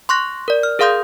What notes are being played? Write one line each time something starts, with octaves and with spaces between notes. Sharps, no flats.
C6 C#6 F#6 A#6
A#4 D5
F6
G#4 A#4 F5 C6 D#6 G6